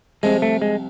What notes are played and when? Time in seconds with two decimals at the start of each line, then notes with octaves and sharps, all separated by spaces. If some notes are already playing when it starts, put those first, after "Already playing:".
0.23 C2 C3 F3 G#3
0.42 A3
0.62 G#3